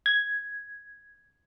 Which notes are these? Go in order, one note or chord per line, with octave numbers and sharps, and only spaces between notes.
G#6